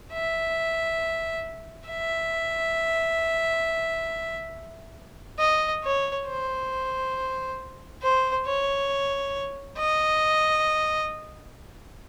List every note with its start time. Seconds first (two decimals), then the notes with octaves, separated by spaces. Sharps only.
0.12 E5
1.88 E5
5.39 D#5
5.83 C#5
6.27 C5
8.02 C5
8.46 C#5
9.78 D#5